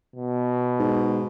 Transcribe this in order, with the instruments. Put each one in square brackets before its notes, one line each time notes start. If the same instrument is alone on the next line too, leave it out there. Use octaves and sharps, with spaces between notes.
[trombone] B2
[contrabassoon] G#2